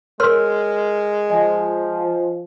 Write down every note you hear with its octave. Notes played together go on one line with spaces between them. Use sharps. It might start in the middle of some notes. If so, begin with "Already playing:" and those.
G#3 A#4 C#5 C6 F6
F3 D#5 G#5